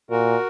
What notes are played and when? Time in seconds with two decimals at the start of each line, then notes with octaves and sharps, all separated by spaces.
0.10 A#2 F#4 A#4